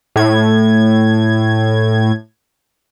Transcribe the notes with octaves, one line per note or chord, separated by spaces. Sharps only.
A2 G#6